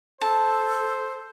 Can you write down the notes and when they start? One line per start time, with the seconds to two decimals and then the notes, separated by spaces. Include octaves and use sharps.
0.21 A4 C5 A5